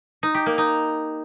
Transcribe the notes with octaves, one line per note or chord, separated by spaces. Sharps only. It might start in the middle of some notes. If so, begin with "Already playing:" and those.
D#4
G4
A#3
D#4